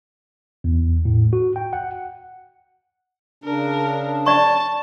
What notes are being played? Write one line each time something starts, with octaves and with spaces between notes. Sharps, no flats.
E2
A2
F#4
G5
F#5
C#3 D4 A#4
D5 A5 C#6